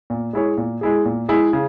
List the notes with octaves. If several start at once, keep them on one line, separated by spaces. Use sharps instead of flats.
A#2
G#3 E4 G#4 C#5
A#2
G#3 E4 G#4
A#2
G#3 E4 G#4
C#3